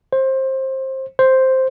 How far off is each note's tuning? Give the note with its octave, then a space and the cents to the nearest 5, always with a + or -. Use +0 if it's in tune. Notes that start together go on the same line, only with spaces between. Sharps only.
C5 +20
C5 +0